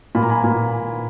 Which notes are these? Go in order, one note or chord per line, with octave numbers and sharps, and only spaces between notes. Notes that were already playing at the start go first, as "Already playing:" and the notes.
A#2 B5
A#5
G#5 B5
A#2